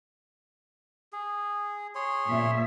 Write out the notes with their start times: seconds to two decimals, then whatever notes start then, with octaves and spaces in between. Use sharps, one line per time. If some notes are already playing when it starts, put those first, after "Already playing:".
1.13 G#4
1.95 G#4 C#5 C6
2.26 A#2 E5